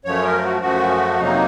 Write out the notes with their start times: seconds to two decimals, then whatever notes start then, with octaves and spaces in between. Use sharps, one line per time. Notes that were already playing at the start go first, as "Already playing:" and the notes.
0.05 F#2 F3 A3 C#5
0.24 A#4
0.43 F#4
0.61 F#2 F3 A3 F#4
1.19 F2 C3 F#3 A#3 D#4